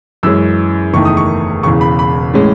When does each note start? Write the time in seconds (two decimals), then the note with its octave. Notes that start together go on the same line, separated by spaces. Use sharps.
0.23 F#2 E3 G#3 C#4 E6
0.93 F#1 E2 D#3 A3 D#4 C#6
1.05 D#6
1.17 C#6
1.63 E1 E2 C#3 C#6
1.81 B5
1.99 B5
2.34 A2 E3 G#3 C#4